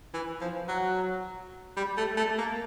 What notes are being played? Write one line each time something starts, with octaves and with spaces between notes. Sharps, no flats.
E3
F3
F#3
G3
A3
A3
A#3